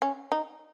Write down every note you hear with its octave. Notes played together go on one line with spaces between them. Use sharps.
C#4
D#4